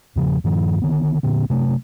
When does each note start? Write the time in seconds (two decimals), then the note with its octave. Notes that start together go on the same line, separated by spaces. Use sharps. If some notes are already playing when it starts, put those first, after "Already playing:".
0.16 E2 C#3 F3
0.44 G2 D#3 F3
0.82 D3 D#3 B3
1.23 A#2 D3 B3
1.50 C3 F#3 A3